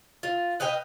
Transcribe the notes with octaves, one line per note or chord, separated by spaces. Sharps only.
F4
B4 D#5 F5 G5